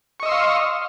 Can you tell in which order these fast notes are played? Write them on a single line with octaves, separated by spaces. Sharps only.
C#6 D#5 E6 C6 F5